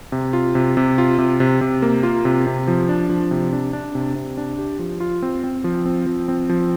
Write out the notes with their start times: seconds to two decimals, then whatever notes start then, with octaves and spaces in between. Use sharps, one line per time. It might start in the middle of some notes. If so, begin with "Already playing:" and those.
0.12 C3
0.33 F4
0.55 C3
0.77 C3
0.98 F4
1.19 C3
1.40 C3
1.61 C3
1.82 A#3
2.03 F4
2.25 C3
2.47 C3
2.68 F3
2.89 D4
3.09 F3
3.31 C3
3.53 D4
3.73 D4
3.95 C3
4.15 C3
4.38 D4
4.58 G4
4.79 F3
5.00 F4
5.22 C4
5.44 C4
5.64 F3
5.86 C4
6.06 F3
6.28 C4
6.49 F3